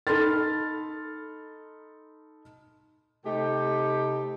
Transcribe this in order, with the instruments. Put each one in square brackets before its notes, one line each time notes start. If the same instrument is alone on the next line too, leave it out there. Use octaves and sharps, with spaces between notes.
[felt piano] D#4 A4 B5 C6 F6 A6
[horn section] C3 A3 D#4 G4